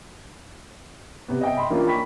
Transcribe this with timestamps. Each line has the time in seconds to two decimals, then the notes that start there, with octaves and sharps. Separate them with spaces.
1.28 C3 B3
1.41 D#5 E5 G5
1.57 B5 C6
1.70 E3 A#3 C#4 D4 F4
1.87 G5 B5 C#6 B6